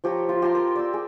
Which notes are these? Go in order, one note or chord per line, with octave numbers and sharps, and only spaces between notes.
F3 G4 C#5 A#5
F4
G4 A5 A#5 C6
A#4
D5 E6
G#4